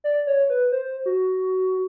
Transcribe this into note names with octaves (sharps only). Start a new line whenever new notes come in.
D5
C#5
B4
C5
F#4